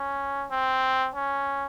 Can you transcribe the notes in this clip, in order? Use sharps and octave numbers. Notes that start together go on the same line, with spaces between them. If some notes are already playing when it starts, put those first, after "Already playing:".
Already playing: C#4
C4
C#4